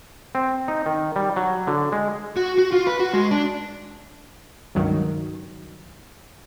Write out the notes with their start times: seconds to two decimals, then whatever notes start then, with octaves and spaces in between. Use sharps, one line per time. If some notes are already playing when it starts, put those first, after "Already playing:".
0.35 C4
0.68 D#4
0.86 D#3
1.16 G3
1.36 F#3
1.67 D3
1.92 G#3
2.36 F#4
2.58 F#4
2.72 F4
2.87 B4
3.00 F#4
3.13 G#3
3.31 D4
4.75 C#2 G2 D#3 F#3